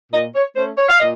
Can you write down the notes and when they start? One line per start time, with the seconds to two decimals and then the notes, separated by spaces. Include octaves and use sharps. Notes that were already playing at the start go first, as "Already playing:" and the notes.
0.13 A#2 D#5
0.34 C#5
0.55 A3 C#4 C5
0.77 C#5
0.89 F5
0.99 A#2 D#5